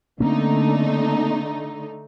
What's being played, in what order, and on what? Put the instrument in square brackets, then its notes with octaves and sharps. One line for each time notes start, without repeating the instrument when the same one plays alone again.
[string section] D3 A3 D#4 [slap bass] A#3 C4 C#4